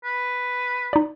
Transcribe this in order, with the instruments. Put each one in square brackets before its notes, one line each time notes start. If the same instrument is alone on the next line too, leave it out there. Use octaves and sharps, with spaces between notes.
[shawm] B4
[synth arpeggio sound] D#4 D5